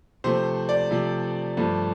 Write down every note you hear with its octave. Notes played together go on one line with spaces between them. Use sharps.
C3 F3 A3 C5
D5
C3 F3 A3
G2 F3 A3